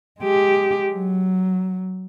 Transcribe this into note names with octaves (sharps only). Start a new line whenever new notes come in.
G#3 G4
F#3